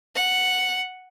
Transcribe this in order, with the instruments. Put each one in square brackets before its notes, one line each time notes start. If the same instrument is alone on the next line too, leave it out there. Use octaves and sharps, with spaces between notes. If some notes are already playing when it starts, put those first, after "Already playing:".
[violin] F#5